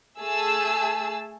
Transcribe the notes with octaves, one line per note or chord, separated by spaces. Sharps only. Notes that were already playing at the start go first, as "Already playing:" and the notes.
A3 G#4 A5 E6